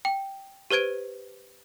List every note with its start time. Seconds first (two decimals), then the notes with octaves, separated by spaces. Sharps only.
0.05 G5
0.71 G4 B4 C5 G#6 D7